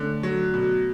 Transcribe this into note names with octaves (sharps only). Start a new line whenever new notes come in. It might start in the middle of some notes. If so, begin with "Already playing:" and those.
Already playing: D3 A3 C#4
F#3
B2